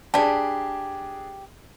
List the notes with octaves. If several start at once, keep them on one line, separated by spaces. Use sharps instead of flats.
D4 G4 G#4 D5 A5 B5